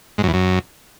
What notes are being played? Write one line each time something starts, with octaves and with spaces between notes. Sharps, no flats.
G#2
F#2
E2
F#2